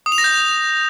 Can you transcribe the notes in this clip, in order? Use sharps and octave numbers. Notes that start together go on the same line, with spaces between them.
D#6
F7
A#6
G6